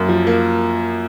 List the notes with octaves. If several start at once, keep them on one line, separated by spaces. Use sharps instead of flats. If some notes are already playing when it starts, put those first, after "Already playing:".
Already playing: F#2 A#3
F3
A#3